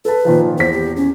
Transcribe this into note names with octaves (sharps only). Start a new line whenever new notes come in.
A4 B4 A5
A#2 D#3 F3
E2 C5 B6
G4
C#4